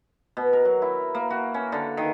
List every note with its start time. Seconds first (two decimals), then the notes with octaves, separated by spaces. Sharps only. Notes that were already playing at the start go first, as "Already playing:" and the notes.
0.37 B2
0.53 A#4
0.65 F#3
0.82 E4
1.15 A#3
1.30 F#4
1.54 C#4
1.72 D3
1.97 D#3